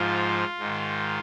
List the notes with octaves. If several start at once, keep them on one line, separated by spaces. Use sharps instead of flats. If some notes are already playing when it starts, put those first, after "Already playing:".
Already playing: G#2 F3 F4
G#2 D#3